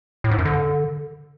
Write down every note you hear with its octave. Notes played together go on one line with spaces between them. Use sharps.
A2
G#2
F#2
D3